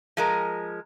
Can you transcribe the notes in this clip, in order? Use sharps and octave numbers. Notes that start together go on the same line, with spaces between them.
F3 G#3 A#4